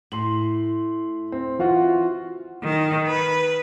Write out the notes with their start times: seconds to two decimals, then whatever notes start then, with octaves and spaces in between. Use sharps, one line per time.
0.12 A2 C6 F#7
1.32 C4
1.59 E3 F4 F#4
2.64 D#3
3.07 B4